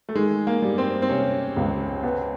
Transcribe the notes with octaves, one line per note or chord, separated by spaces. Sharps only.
A3
D#3 G#3
A#3
G3
C4
C4
C3 C#4
C#2
B3